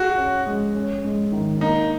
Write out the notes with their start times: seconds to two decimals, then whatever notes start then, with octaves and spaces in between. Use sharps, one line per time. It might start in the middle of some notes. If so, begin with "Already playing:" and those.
Already playing: F#4 G#4
0.17 C#4
0.46 G#3
0.75 C#4
1.04 G#3
1.32 D#3
1.61 A#3 D#4